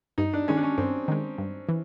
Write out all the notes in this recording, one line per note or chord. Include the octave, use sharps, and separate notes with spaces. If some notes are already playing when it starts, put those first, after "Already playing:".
G2 D#4
D4
D#3 G#3 C#4
D4
C#4
G2 C4
D#3 G#3
G2
E3